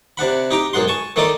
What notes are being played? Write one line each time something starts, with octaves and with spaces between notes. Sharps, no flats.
C3 D4 F#5 B5
D#4 G4 A#5 D6
B1 F#2 G#3 F#5 C6
G#5 A5 C#6
D#3 A3 D#4 D5 D#5 D6